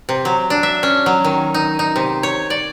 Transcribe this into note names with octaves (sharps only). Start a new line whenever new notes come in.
C3
F#3
D4
E5
C#4
F#3
D#3
D#4
D#4
C3
C#5
D5